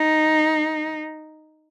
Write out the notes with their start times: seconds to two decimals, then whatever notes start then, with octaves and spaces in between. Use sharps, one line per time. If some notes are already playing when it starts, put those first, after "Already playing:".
Already playing: D#4